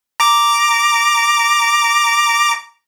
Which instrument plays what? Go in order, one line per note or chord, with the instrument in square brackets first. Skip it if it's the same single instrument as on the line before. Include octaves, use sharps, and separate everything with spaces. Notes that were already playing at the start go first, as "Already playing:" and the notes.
[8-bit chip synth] A#5 D6